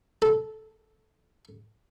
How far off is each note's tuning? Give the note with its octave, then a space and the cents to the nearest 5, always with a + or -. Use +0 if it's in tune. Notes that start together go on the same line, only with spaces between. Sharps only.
A4 -10